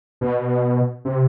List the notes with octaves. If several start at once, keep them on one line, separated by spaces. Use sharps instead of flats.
B2
C3